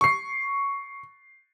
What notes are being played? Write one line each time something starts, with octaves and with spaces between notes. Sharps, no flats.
C#6 C7